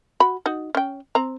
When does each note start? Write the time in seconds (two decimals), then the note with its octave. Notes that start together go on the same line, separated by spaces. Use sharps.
0.20 F#4 B5
0.46 D#4 F#4
0.75 C#4 G5
1.15 C4 A#5